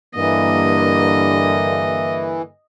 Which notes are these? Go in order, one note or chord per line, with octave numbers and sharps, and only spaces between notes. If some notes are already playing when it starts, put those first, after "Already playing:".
G2 D3 E3 A#3 D#5